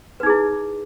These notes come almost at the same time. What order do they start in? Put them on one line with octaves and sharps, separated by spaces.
B4 D#4 G#4 E4